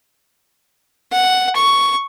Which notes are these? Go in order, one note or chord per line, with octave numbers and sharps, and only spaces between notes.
F#5
C#6